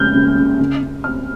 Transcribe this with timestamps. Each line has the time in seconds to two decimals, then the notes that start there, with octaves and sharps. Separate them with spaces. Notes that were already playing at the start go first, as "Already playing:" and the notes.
Already playing: C#2 G#3 C4 F6 G6
0.15 C#3
0.37 C#3
0.60 C#3
0.83 C#3
1.04 C4 F6